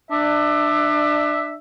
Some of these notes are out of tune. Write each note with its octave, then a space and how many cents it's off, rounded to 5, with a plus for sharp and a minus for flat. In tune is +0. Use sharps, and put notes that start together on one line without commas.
D4 +25 E5 +0